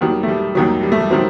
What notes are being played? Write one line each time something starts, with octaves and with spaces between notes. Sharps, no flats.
D#2 D#3 F#3 G3
A3
G3
D#2 D#3 F#3
G3
A3
G3
D#3 F#3 C4